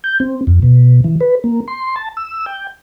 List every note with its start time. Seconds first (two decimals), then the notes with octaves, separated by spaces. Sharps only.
0.04 G6
0.20 C4
0.47 F2
0.62 B2
1.04 E3
1.21 B4
1.44 A#3
1.68 C6
1.96 A5
2.17 E6
2.46 G5